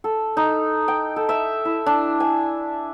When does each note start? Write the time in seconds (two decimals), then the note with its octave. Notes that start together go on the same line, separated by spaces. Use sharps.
0.04 A4
0.37 D#4
0.88 G5
1.16 A4
1.29 E5
1.65 E4
1.86 D4
2.20 G#5